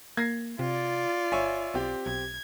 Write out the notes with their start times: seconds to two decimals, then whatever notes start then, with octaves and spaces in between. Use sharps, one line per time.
0.17 A#3 G#6 A#6 C7
0.59 C3 F4 D5
1.32 G1 C#5 E5 G#5
1.74 B1 C4 G4
2.06 B1 G#6